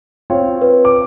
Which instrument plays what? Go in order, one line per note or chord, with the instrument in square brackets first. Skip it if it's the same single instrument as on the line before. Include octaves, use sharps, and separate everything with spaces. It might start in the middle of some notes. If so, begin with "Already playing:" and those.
[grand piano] C4 F4 C#5
[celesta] B4
[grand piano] D6